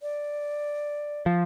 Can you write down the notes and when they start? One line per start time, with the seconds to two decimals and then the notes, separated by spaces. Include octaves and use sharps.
0.02 D5
1.26 F3